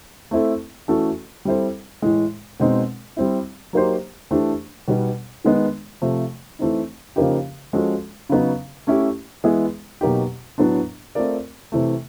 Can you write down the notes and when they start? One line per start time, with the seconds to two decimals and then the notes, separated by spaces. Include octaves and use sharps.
0.31 A3 C4 E4 A4
0.88 E3 A3 C#4 F#4 A4
1.45 G3 C4 E4 A4 C5
2.02 A2 E3 G#3
2.60 B2 G#3 C4 D#4
3.17 G3 C4 E4
3.73 F#3 A#3 D#4 G4 C5
4.31 E3 A3 D4 G4 C5
4.88 B2 G3 B3 D#4
5.44 D#3 G#3 B3 D#4
6.02 C3 F3 A3
6.59 E3 A3 C4 D#4
7.16 C#3 F3 A#3 D#4 G4
7.73 F3 G#3 C#4 F#4 A4
8.29 C#3 F#3 B3 D#4
8.87 A3 C#4 E4 G4
9.44 E3 G#3 B3 E4 G#4
10.01 B2 F#3 A#3 D#4 G4
10.58 A2 F#3 B3 D4
11.15 A3 C4 F4 A#4 D5
11.72 C3 E3 A3